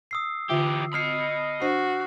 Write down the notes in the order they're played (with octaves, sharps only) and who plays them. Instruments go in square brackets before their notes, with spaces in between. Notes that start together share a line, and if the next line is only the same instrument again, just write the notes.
[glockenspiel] D#6 E6 C7
[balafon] D3 F4 E5 [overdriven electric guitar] E3 G4
[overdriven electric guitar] D#5 B5 [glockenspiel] D#6 F6 C7
[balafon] D4 C5 [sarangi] F#4 [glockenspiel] C7